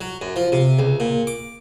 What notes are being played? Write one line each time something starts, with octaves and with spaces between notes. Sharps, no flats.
F#3
F#2
F3
C3
C#2
A#2
D6